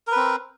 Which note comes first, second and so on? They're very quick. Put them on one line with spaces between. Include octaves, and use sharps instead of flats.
A#4 B4 C4